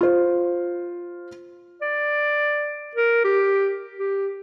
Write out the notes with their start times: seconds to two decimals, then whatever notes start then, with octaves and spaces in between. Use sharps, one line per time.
0.01 F4 C5
1.81 D5
2.95 A#4
3.24 G4
3.98 G4